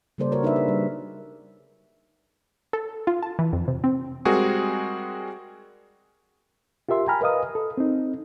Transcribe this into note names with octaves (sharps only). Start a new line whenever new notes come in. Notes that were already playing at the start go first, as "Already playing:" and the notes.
C#3 G3 A#3 A4 C5 D5
F#4 A#4 C5 C#5
D4 D#4 B4 C#5 D5 E5
G#4 B4
G3
A4
F4
A5
E3
F2
C3
C4
G3 G#3 C4 F#4 G#4 A#4
F4 G4 A#4 E5 C6
G5 G#5 A#5 B5 F6
A#4 B4 D#5 F5 D#6
A4
C4 D#4